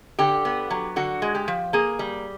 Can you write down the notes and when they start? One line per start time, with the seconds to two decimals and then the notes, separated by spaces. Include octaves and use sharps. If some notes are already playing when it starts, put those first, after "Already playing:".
0.19 D3 G4
0.45 B3
0.70 F#3
0.96 D3 F#4
1.22 G#3
1.35 G4
1.48 F3
1.73 A#3 G#4
1.99 G3